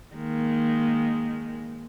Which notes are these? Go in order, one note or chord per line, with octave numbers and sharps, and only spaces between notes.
D#3 G#3 A#3